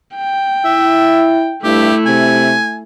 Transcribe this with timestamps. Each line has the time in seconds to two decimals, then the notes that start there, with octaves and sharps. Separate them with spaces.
0.16 G5
0.65 E4 E5
1.64 G2 A3 E4 G4
2.06 C3 G#5